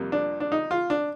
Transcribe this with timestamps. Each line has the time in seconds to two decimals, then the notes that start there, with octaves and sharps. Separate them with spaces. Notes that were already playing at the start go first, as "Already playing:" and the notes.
Already playing: F2 C3 G3 A#3
0.12 D4
0.40 D4
0.52 D#4
0.71 F4
0.90 D4